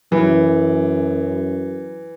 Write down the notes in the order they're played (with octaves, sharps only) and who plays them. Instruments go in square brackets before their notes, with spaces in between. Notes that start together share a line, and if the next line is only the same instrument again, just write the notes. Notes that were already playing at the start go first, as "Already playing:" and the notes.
[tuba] F#2 [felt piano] E3